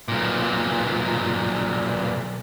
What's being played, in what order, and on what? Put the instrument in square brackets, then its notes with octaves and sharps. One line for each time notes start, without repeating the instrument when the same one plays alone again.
[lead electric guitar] B1 A#2